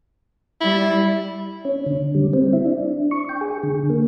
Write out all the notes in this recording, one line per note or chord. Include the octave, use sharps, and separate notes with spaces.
G3 E4
C#4
D3
G3
C4
E4
D4
C#6
G5
G#4
D3
A#3